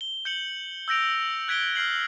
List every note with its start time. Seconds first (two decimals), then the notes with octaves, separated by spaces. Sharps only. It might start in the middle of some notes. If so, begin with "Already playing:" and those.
0.01 G7
0.25 G6 C#7 F#7
0.88 E6 G6 A#6 D7 F7
1.48 F#6 G#6 B6 D7 G7
1.75 F6 G6 C7 F#7